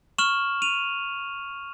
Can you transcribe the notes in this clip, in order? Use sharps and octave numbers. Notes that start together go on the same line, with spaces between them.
C#6 F6 E7 F#7
D#7 F7